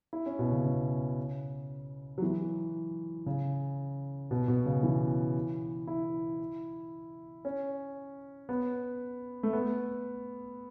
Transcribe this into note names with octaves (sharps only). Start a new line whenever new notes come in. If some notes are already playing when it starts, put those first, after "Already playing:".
E4
C#4
B2
C#3
C#3
F#3
E3
C#3
B2
B2
C#3
E3
E4
C#4
B3
A3
B3